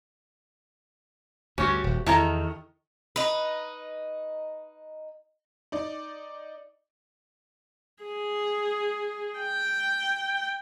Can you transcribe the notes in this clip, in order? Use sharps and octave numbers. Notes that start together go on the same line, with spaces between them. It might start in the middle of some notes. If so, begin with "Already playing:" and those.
D2 G2 C#4 F#4 G4
D#1
E2 D#3 E4 A4 A#5
D#4 B4
D#4 D5
G#4
G5